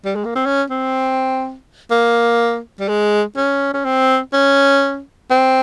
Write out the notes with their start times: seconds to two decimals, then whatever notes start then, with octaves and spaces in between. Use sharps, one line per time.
0.05 G3
0.15 G#3
0.25 A#3
0.35 C4
0.46 C#4
0.70 C4
1.91 A#3
2.80 G3
2.89 G#3
3.37 C#4
3.74 C#4
3.85 C4
4.33 C#4
5.31 C4